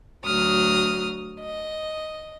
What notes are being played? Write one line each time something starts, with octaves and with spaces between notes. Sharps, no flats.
D2 F#3 D#6 F6
D#5